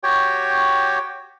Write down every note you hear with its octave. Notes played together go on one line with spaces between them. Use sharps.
F#4 G4 C#5 G5